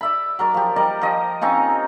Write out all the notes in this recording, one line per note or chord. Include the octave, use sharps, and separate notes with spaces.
D5 E5 B5
F#3 A#4 D5
F3 G4
G3 A#4 D5 D#5
F3 G4 D#5
C4 C#4 D#4 F4